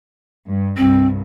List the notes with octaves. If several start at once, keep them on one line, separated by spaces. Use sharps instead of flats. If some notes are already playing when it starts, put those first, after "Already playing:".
G2
C2 G2 C4